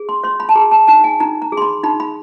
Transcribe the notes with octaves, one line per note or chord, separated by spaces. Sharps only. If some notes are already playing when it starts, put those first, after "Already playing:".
Already playing: G#4
C6
C#5 C6
B5
A5
G#4 A#5
A5
D#4 A5
G#5
D#4 A#5
A#5
G#4
C6
B5
D#4 B5
B5